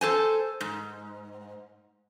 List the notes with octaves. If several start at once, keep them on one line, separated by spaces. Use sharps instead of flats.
A4 C5 G#5
G#2